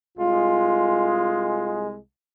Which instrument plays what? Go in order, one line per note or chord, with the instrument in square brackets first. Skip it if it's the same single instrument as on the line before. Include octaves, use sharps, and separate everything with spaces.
[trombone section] C2 G#3 [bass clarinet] F4